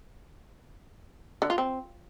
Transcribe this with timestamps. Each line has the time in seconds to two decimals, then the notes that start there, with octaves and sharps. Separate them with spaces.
1.42 D3
1.50 F4
1.58 C4